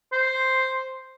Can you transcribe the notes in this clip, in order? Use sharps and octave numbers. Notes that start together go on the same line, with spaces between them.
C5